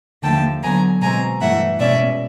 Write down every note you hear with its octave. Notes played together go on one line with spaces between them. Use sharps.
D#2 D3 F3 A3 G5 A5
D3 F#3 B3 G#5 A#5
B2 G#3 C4 G#5 A#5
G2 E3 A3 E5 F#5
B2 G#3 C#4 D5 E5